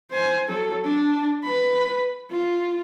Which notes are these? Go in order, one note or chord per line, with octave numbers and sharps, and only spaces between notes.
C5 G#5
F#3 A4
D4
B4 B5
F4